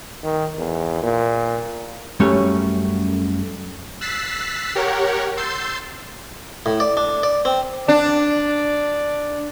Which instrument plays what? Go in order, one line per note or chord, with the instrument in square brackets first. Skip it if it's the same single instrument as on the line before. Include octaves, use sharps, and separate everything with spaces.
[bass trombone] D#3
E2
A#2
[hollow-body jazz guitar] F#2 G3 A3 C#4 C#5
[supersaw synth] E6 F#6 A6 B6 C7
G4 A#4 C#5 F#5
C6 E6 G6 A6 C7
[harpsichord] A2
D5
D4
D5
C4
[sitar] D4 [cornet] D5